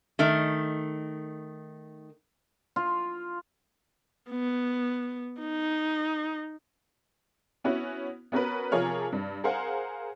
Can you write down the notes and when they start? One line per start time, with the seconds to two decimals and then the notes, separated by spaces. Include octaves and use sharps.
0.19 D#3 A3
2.76 F4
4.30 B3
5.40 D#4
7.64 B3 C#4 E4 F#4
8.32 B3 C#4 F#4 A#4 B4
8.72 C3 F3 G#4 A#4 C#5 F6
9.12 G2
9.44 G#4 A#4 C5 F5 F#5 G#5